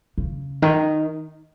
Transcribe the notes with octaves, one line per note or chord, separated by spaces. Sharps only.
C#3
D#3